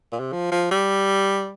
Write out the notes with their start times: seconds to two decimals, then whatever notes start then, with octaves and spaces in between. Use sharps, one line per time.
0.12 A#2
0.20 C3
0.33 F3
0.52 F3
0.71 G3